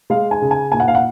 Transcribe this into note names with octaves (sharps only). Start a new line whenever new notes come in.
G#3 F5
G#5
C#3
G#5
A#2 G#5
F#5
F5
F#5